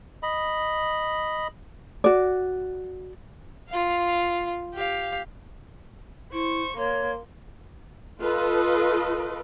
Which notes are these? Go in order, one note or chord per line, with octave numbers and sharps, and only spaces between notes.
D#5 B5
F#4 D5
F4 F5
G4 F5
E4 C5 C#6
A#3 C#5 C6
F4 A4 B4 D#5